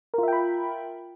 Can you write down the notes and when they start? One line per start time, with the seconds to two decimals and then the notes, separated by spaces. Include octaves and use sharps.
0.14 A#4
0.18 F4
0.23 E5
0.28 G5
0.33 B5